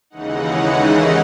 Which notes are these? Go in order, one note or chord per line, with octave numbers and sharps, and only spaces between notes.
D#2 C#3 E3 G#3 D#4 F#5